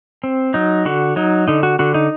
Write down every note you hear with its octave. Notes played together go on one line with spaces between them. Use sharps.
C4
F#3 D#4
D3 F#4
F#3 D#4
D3 D#4
F#4
D3 F#4
D#4